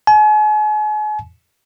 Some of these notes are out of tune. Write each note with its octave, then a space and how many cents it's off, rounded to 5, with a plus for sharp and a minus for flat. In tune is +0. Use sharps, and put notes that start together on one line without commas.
G#5 +40